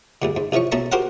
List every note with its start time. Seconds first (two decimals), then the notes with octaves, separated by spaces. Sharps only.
0.22 D2 G2 D3
0.36 G#2
0.52 C2 E3 F3 C#4 C#6
0.72 B2 A3 C#4 A4 A5 A#5
0.92 F#4 G4 A#4 C5 F5 F#5